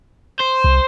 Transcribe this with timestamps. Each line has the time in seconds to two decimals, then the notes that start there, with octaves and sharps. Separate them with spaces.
0.40 C5
0.64 C2